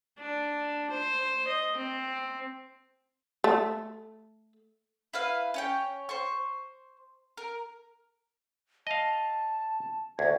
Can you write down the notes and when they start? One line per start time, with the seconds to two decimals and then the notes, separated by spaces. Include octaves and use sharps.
0.18 D4
0.90 C5
1.47 D#5
1.76 C4
3.44 A3
5.13 E4 B4 F5
5.54 C#4 C#5 G5
6.09 C5 C#6
7.37 A#4
8.87 D#5 F5 A5
10.19 D2 G#6